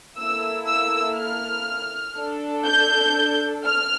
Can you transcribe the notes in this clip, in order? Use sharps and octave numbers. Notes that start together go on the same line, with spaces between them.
A#3 E4 A4 E6
E6
F6
D4 A4
G6
F6